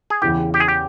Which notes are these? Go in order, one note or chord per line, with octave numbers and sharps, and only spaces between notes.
G#4
E2 C#3 E3 G4
G4
G#4
G4